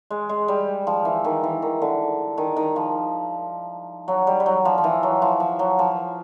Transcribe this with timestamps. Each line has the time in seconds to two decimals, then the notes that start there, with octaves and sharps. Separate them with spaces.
0.10 G#3
0.29 G#3
0.48 G3
0.87 F3
1.05 E3
1.24 D#3
1.44 E3
1.62 D#3
1.82 D3
2.38 D#3
2.56 D#3
2.76 F3
4.08 F#3
4.27 G3
4.40 G3
4.46 F#3
4.65 F3
4.78 F3
4.84 E3
5.03 F#3
5.22 F3
5.40 F3
5.59 F#3
5.79 F3